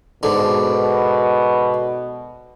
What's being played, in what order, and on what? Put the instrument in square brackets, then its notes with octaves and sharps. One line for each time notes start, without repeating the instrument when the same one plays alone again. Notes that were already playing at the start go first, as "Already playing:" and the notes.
[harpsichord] G#2 D3 [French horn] B2